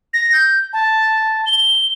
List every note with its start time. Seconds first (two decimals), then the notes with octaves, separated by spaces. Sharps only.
0.14 A#6
0.33 G6
0.73 A5
1.46 G7